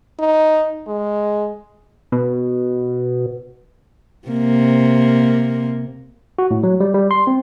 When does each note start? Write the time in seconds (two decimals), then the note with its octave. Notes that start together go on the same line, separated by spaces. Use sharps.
0.19 D#4
0.87 G#3
2.12 B2
4.28 C3 A#3
6.39 F#4
6.51 A2
6.63 F#3
6.80 G3
6.94 G3
7.11 C6
7.27 C4